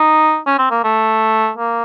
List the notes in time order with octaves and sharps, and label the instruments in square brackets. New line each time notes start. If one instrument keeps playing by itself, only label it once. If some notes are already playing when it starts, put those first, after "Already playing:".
Already playing: [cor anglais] D#4
C#4
C4
A#3
A3
A#3